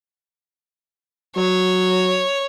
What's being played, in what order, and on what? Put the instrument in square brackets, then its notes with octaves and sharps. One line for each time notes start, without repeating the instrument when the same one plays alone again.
[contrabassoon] F#3 [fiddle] C#5